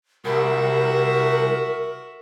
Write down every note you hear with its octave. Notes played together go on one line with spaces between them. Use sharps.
C2 F#4 A#4 E5